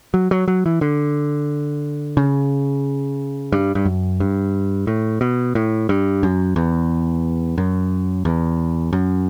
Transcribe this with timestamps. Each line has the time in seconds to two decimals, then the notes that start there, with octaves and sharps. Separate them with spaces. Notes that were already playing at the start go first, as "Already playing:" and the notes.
0.14 F#3
0.31 F#3
0.48 F#3
0.66 E3
0.81 D3
2.17 C#3
3.52 G2
3.75 G2
3.85 F#2
4.20 G2
4.87 A2
5.21 B2
5.55 A2
5.89 G2
6.23 F#2
6.56 E2
7.58 F#2
8.25 E2
8.93 F#2